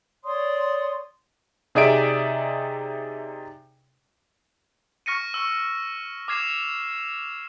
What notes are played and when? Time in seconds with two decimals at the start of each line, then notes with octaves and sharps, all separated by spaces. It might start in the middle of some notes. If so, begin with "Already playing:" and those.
0.24 C#5 D5 C6 D#6
1.75 C3 D#4 G#4 D5 E5 D7
5.06 C#6 F6 A#6 C#7 D#7
5.34 C#6 E6
6.28 D6 F6 G#6 C7 E7